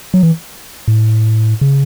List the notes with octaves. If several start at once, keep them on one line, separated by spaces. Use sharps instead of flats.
F#3
E3
A2
C#3